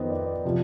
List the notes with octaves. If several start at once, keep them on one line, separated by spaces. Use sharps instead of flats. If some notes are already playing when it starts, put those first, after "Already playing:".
Already playing: F2 D#3 B3 C5 D#5
D5
C3 F3